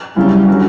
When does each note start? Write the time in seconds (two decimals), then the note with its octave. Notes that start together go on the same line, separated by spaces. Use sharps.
0.16 C#3 F#3 G3 C#4 E4
0.48 D3 F#3 C#4 F#4